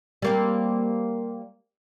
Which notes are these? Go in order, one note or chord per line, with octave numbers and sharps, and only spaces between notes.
G3 A#3 C4